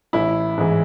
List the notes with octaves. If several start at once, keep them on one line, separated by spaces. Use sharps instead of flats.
A1 E4
G#2 E3